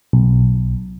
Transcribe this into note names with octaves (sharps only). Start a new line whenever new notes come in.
B1